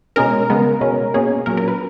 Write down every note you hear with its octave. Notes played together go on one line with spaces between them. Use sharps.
B2 G#3 C#4 A#4
C#3 G#3 B3
B2 G#3 C#4
B2 A#3 C#4 G#4
A#2 F#3 C#4 A#4
A#4
B4